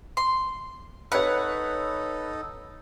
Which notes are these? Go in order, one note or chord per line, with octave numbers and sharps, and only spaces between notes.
C6
D#4 A4 B4 C#5 F#5